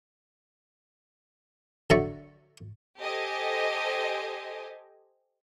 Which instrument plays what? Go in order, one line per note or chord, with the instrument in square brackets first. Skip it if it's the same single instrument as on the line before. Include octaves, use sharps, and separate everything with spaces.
[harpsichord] D3 F#3 D5 E5 A#5 C#6
[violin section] G4 A4 C5 D#5 G#5